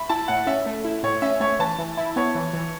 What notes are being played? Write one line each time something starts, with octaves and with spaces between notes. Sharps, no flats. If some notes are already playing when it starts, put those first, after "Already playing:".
Already playing: E5 B5
E4 A5
A2 F#5
C#4 E5
A3
E4
A2 C#5
C#4 E5
A3 C#5
E3 A5
E3
E4
B3 C#5
E3
E3